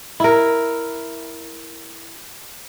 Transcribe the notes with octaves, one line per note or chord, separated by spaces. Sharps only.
E4 A#4